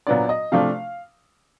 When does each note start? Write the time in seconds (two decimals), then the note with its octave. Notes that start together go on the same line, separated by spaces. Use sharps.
0.07 A#2 F#3 B3 D4 D5
0.29 D#5
0.52 C3 F3 A3 D4 F5